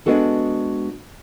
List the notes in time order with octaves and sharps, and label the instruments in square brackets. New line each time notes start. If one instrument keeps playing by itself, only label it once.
[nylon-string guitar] G#3 A#3 B3 D4 F#4 A4